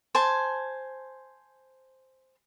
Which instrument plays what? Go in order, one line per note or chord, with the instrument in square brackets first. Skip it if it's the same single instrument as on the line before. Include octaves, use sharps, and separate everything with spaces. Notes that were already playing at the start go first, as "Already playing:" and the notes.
[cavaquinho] C5 G#5 A5